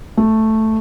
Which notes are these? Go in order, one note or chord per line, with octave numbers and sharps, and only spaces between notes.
A3